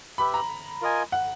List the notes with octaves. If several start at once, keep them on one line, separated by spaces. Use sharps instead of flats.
G4 B4 E5 B5
A#5
F4 A#4 D#5 G#5
F#5